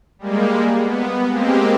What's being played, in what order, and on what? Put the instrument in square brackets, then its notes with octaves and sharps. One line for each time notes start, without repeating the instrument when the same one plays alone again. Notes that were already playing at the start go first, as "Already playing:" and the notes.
[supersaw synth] G3 G#3 A#3
B3
G#3 A#3 C4 G4